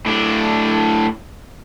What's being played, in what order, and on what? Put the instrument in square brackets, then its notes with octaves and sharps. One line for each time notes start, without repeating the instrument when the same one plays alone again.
[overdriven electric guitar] A2 D4